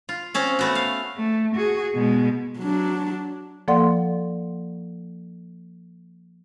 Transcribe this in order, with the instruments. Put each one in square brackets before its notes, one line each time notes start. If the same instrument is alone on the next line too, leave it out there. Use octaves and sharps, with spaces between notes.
[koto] F4
C4 C#4 F5
A3 B3 F#4
F5
[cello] A3
F#4 G#4
B2 G#3
[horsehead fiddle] F#3 D4
[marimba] F3 A#3 A4 D5 F#5 C6